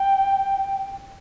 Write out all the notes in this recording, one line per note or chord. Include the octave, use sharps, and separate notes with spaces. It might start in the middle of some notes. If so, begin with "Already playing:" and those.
Already playing: G5